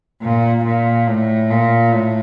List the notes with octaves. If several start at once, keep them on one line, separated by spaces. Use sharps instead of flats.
A#2
A#2
A2
A#2
A2